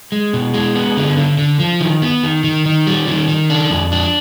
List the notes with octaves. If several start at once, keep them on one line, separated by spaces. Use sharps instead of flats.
G#3
B2
G#3
B3
D3
D3
D3
F3
D#3
B3
D#3
D#3
D#3
G3
D#3
D#3
D4
F2
D4